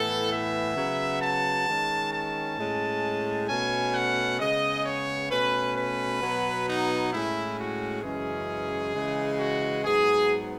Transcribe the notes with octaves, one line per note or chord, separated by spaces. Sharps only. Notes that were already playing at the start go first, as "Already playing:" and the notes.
Already playing: A2 E3 B3 A4
E5
C#3 F#3 B3
A5
D#3 G#3 C#4
A5
A2 G#3 C#4
B2 A3 C#4 G#5
F#5
C#3 G#3 B3 D#5
C#5
B2 A3 C#4 B4
B4
B2 F#3 B3
D#4
A2 G#3 C#4 E4
F#4
F#2 C#3 E3 G#3 C#4 G#4
C#3 E3 G#3
F#4
G#2 F#3 B3 G#4